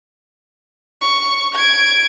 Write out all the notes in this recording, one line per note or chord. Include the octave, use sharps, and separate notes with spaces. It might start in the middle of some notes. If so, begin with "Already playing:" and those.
C#6
G#6 D7